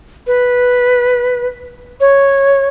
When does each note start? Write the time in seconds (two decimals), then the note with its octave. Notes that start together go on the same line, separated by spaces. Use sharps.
0.27 B4
2.00 C#5